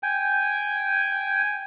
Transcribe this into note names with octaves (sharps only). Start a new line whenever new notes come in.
G5 G#5